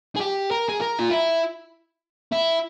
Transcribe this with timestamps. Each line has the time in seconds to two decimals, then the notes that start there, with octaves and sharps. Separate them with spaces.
0.16 G#4
0.21 G4
0.51 A#4
0.69 G#4
0.82 A#4
0.99 F4
1.11 E4
2.32 E4